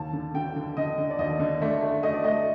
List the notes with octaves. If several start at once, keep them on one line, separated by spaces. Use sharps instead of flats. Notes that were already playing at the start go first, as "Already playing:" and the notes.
Already playing: D#2 A5
D3
D3 G5
D3
D3 D#5
D3
D5
D#2 D#5
D3
A3 D5
A3
A3 D#5
D5
A3 D#5